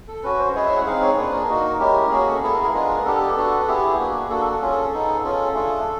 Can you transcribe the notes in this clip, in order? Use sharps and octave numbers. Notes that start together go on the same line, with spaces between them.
A4
C#4 F#4 B4
C5
G#3 C#4 E4 G#4 C#5
E5
F#5
C4 D#4 G#4 F5
C#5
A#3 D4 F4 G#4 B4
A#4
A#3 D#4 F#4
G#3 C#4 E4 G4
A#3 C#4 F#4 G#4
A4
B3 E4 G#4 A4
A#4
A#4
G#3 B3 D4 F4 G#4
B3 D4 G4 A4
A4
B3 D4 F#4
B3 E4 G4 G#4
A#3 D4 F#4
A#3 D4 F#4 A4
A4
C#4 F4 G#4
A4
A4
B3 D#4 G#4
C#4 F4 G#4 A4
A3 D4 F4 G#4